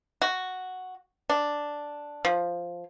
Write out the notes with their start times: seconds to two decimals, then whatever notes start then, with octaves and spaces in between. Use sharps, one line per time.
0.22 F#4
1.30 D4
2.25 F3